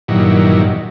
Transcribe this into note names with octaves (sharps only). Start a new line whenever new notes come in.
G2 A#2 D#3 E3 F#3